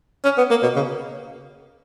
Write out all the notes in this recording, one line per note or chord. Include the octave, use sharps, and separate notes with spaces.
C#4
B3
A#3
B2
C#3